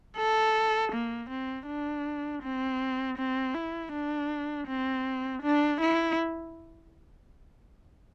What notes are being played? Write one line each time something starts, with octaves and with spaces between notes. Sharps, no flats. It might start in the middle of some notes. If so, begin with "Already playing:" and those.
A4
A#3
C4
D4
C4
C4
E4
D4
C4
D4
E4